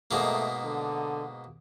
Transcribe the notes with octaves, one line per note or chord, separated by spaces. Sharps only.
G#2 B2 A3 A#3
D3